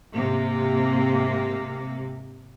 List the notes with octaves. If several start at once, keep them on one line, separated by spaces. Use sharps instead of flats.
G#2 C3 A#3